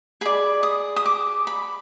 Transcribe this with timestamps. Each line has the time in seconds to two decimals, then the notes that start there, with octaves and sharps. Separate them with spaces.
0.21 G#4 D5 B5
0.63 D#6
0.96 D#6
1.06 D6
1.47 B5